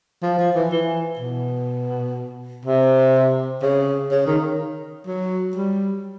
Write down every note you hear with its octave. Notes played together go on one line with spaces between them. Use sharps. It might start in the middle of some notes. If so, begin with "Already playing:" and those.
F3
F3
E3
E3
B2
C3
C#3
C#3
D#3
F#3
G3